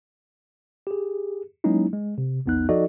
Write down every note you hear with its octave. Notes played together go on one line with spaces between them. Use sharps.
G4 G#4
F#3 G#3 A#3 C#4 D#4 E4
G#3
C3
A#1 E2 B3 D#4 F#6
F3 D#4 F#4 A4 D5 D#5